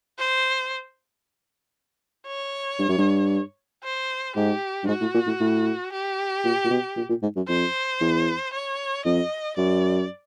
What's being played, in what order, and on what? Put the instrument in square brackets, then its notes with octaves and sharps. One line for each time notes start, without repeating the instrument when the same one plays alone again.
[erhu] C5
C#5
[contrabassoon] G2
F#2
G2
[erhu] C5
[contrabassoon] G#2 [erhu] G4
[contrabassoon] G2
[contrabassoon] G#2 [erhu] F#4
[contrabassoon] A2
A#2
A2
A2
[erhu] G4
[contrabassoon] A#2
A#2
B2
A#2
A#2
G#2
F#2
[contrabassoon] F2 [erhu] C5
[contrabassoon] E2
[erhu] C#5
[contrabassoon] F2 [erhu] D#5
[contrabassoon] F#2 [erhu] D5